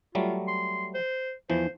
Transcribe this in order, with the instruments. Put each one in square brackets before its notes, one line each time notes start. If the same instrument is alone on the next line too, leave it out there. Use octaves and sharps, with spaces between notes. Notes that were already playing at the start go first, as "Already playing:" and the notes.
[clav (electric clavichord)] F#3 G3 A3 [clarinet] F4
[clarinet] C6
C5
[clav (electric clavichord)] E2 E3 F3 [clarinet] C5